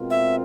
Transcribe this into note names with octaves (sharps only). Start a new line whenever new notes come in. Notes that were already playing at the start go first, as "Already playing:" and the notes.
Already playing: B2 G#3 C4 F4 A#4
E5